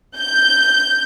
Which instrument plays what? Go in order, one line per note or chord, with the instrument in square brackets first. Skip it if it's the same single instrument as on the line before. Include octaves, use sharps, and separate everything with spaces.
[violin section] G6